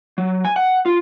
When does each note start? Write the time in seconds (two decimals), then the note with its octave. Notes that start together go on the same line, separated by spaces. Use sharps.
0.18 F#3
0.45 G#5
0.56 F#5
0.86 F4